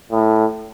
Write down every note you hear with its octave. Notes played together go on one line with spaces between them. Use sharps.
A2